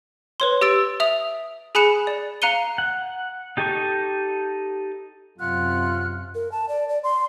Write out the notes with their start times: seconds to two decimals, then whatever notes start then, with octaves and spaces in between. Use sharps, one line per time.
0.40 B4 C#5 C6
0.61 G4 E6 A6 D7
1.00 E5 D#6 F7
1.75 G#4 G#5 B5 F#6 C#7 E7
2.07 D5
2.42 F5 A#5 F#6 C#7 D#7 G7
2.78 F#5
3.57 D#4 G4 A4 D#5 C#6
5.39 F#2 C3 F4 F#5 F6 F#6
6.35 A#4
6.52 A5
6.69 D5
6.89 D5
7.04 C6